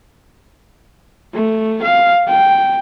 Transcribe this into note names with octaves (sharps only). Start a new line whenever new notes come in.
A3
F5
G5